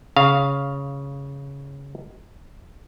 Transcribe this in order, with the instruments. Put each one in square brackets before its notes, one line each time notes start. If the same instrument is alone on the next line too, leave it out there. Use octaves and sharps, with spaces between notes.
[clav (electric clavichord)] C#3 F5